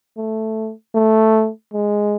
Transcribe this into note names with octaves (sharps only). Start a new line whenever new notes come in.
A3
A3
G#3